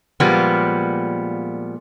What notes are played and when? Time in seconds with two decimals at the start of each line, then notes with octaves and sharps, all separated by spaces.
0.20 A#2 F3 G3 G#3 A#3 B3